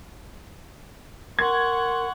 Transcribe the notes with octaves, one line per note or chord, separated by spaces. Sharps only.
A#4 F#5 C6 C#6 G#6